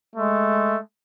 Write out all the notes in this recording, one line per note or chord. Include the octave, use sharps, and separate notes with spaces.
G#3 A3